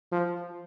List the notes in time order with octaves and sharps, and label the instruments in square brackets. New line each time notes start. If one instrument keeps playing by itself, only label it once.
[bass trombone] F3